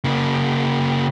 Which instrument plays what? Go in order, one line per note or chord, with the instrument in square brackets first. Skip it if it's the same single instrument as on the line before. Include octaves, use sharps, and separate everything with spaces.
[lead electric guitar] C#3 A#3